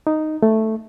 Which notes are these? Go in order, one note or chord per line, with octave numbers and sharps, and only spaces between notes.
D#4
A3